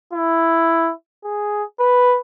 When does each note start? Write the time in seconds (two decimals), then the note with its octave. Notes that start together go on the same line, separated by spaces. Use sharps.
0.14 E4
1.25 G#4
1.80 B4